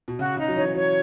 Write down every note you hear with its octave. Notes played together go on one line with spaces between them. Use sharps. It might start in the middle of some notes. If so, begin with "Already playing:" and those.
B2
C#3 F#4
C#3 D#4
F#3
E3 C#5
F#3 C#5